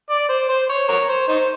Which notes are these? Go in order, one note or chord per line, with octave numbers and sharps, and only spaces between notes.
D5
C5
C5
C#5
A#4 C#5
C5
D#4 C5